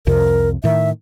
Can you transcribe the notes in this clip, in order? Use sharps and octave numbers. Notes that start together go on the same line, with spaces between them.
C2 F2 C3 A#4
A2 D#3 E5